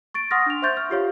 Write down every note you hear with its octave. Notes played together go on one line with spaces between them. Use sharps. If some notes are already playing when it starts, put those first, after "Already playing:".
C#6 A6 D7
F#5 C6 D#6 F6 A6 A#6
D4 F7
C5 E5 C6 C#6 G6 A6
F6
F4 G4 C#5 F5